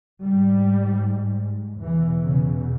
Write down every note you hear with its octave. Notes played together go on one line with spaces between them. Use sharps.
G#2 G3
E2 B2 E3
C#3